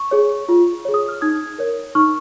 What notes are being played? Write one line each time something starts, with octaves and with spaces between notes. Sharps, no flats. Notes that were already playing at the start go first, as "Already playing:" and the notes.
Already playing: C#6
G#4 C#5
F4
G#4 C#5
D#6
F6
D#4 D#6 G#6
A#4 C#5
D#4 C#6 F6